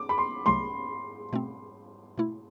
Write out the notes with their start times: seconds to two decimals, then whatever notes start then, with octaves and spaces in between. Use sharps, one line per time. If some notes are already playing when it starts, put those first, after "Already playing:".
Already playing: D6
0.09 B5
0.18 C6
0.46 C2 C3 F#3 A3 C6
1.33 B2 A3 C4
2.18 B2 A3 E4